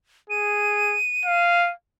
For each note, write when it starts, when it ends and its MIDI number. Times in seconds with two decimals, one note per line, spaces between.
0.30 0.97 68
0.30 1.68 99
1.25 1.73 77